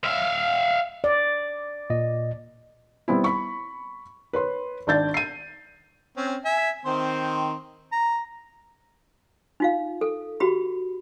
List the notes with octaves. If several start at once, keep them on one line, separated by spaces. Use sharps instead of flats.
E5 F5
D5
A#2 D#5
G3 B3 C4 E4
B5 C#6
B4 C#5 C6
G#1 D4 D5 G6 A6
C7 D#7
C4 C#4
E5 G#5
D#3 C4 C5
A#5
D#4 F4 F5
A4
F#4 G4 B5